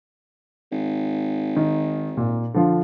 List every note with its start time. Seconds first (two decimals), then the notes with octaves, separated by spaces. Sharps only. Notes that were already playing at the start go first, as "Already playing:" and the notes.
0.72 G#1
1.56 D#3
2.17 A#2
2.54 D3 F3 F4